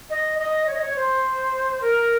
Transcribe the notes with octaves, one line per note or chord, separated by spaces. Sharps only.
D#5
D#5
C#5
D#5
C#5
C5
A#4